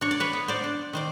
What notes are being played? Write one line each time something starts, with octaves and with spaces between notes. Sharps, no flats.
D4 C#5
D5
B4 C#5
B3
C5 D5
D4
D#3 C5 D5